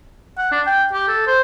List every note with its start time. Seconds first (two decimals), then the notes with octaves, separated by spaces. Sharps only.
0.38 F#5
0.52 D4
0.67 G5
0.93 G4
1.08 A4
1.27 C5